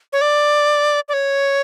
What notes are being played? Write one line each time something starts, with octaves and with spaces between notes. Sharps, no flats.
C#5
D5
D5
C#5